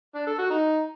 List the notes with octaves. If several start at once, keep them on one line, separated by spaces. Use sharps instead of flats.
D4
A4
F#4
D#4